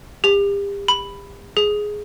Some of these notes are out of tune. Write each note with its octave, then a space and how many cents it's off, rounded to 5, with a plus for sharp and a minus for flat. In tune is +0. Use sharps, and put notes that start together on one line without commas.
G4 +35
B5 +5
G#4 +5